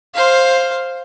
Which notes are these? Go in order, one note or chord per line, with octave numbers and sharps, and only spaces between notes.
C5 F5